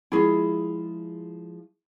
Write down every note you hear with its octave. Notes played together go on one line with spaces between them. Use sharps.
F3 G#3 E4 F4 G#4